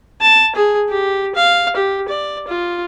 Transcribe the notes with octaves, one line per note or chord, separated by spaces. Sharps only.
A5
G#4
G4
F5
G4
D5
F4